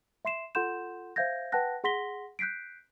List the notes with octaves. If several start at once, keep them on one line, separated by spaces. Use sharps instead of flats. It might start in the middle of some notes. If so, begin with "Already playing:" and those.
E5 C6 C7 E7
F4 A4 F#5 C6 G6 E7
C5 E5 F5 G6 G#6 A#6
B4 F#5 G5 A5 F#6 A#6
G#4 F#5 C6 A#6 B6 G7
F#6 G6 B6 C7 D7